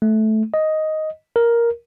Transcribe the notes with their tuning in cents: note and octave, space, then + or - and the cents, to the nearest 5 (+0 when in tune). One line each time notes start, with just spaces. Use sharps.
A3 -15
D#5 +5
A#4 +5